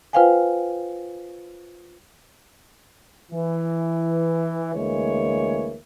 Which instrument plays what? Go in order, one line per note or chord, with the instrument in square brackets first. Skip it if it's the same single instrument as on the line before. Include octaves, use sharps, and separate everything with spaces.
[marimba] F4 B4 C5 F5 G5 G#5
[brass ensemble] E3
D2 E3 G#3 A#3 C#5